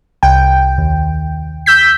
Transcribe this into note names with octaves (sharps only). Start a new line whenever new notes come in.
C2 G5
D#2
E6 G6 B6